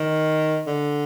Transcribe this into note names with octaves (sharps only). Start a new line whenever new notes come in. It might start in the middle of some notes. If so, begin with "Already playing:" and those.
Already playing: D#3
D3